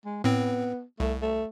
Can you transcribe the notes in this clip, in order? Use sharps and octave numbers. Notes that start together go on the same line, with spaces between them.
G#3
A2 B3 C4
C2 A3
A3